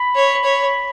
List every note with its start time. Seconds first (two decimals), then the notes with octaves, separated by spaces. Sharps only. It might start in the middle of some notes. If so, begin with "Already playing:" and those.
Already playing: B5
0.15 C#5
0.44 C#5